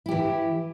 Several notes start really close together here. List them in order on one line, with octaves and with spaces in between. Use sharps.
E4 G4 E3